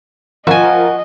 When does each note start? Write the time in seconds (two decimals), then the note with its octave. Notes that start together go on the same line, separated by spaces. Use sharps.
0.47 F3 F4 F#4 A#4 D#5 G#5